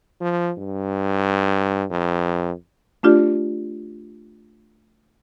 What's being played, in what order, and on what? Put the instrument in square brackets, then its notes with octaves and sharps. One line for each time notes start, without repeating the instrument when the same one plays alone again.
[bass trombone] F3
G2
F2
[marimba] A3 D4 F4 G4 D5